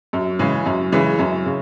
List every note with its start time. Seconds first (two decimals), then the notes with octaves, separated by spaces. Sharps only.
0.13 F#2
0.39 C#3 E3 G#3
0.66 F#2
0.92 C#3 E3 G#3
1.19 F#2
1.45 C#3